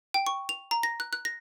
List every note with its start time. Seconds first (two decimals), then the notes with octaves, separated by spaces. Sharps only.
0.14 G5
0.27 C#6
0.49 F7
0.71 A#5
0.83 A#6
1.00 F#6
1.13 F#6
1.25 A#6